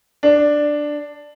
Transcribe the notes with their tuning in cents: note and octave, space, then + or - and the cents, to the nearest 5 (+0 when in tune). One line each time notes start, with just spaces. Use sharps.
D4 +5